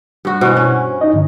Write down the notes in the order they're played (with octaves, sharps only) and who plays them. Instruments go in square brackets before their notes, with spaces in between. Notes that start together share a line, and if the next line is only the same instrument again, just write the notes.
[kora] G2 F#4
[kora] B2 E3 [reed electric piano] C5
[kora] C#4
[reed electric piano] D#4 D#5
G2 D3